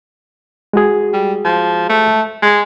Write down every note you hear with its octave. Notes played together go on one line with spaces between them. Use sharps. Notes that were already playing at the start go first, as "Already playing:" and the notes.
G#3 F#4 G#4
G3
F3
A3
G#3